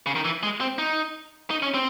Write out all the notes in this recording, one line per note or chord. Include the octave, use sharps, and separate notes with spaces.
C#3
D#3
E3
G#3
C4
D#4
D#4
C#4
C4